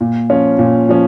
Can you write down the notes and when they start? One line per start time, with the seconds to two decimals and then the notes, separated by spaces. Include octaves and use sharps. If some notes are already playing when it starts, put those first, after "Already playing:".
0.01 A#2
0.30 F3 C#4 F4
0.59 A#2
0.89 F3 C#4